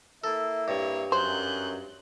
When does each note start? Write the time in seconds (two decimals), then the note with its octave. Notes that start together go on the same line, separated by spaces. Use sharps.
0.24 A#3 E4 A4 E5
0.68 G2 C#5
1.12 F#2 C5 F#6 G6